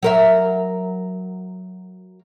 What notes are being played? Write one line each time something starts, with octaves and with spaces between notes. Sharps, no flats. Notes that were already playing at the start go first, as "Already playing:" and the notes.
F#3 A#4 E5